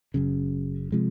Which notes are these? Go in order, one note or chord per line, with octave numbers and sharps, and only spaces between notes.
F#1 F#2 C#3
C3 F3 G#3